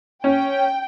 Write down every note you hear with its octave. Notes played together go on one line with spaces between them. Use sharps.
C#4 G5